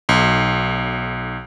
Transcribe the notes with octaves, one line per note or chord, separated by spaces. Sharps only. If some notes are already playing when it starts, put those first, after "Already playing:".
B1